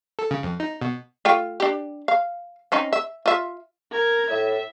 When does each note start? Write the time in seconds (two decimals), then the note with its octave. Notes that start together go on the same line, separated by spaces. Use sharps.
0.19 A4
0.31 C#3
0.43 F2
0.60 D#4
0.81 B2
1.25 A3 F4 G5
1.60 D4 G4
2.08 F5
2.72 C4 C#4 D#4
2.93 E5
3.26 F4 E5
3.91 A#4 G#6
4.30 A2 E5